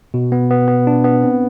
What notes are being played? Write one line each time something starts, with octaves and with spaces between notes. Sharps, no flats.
B2
B3
B3
B3
D4
B3
C4